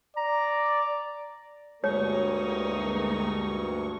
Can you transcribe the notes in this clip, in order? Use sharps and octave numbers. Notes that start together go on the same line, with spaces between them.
D5 A#5
D2 G2 G#3 A#3 D#4 C#5 C#6